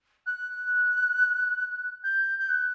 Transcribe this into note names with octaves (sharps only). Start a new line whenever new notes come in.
F#6
G6
G6
F#6